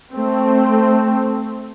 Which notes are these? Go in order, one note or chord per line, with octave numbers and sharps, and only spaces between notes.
A3 C4